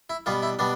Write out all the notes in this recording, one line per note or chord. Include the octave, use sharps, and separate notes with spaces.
E4
B2 G3 B3 F4
E4
B2 G3 B3 D4